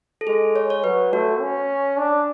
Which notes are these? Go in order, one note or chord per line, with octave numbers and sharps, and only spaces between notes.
A4
G#3 G#4
C#5
C#5
F#3 B4
A3 F#4
C#4
D4